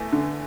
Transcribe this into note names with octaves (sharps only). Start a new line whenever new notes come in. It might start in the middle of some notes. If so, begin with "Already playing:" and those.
Already playing: E2 A3
D3